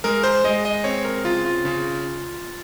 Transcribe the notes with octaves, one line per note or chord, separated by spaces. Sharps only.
G#3 A#4
C5
G#3 D#5
D#5
C4 C#5
A#4
C#3 F4
F4
C#3